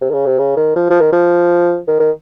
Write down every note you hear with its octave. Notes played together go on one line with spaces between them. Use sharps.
C3
D#3
C#3
C3
C#3
D#3
F3
F3
D#3
F3
D#3
D#3